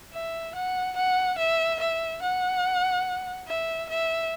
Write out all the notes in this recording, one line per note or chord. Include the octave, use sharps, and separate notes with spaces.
E5
F#5
F#5
E5
E5
F#5
E5
E5